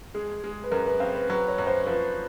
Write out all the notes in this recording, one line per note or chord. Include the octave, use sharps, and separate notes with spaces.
G#3 G#4
G#3
B4
F#2 A#4
B4
C4 F5
B4
F#3 B4
C#5
F#2
C5
F3 B4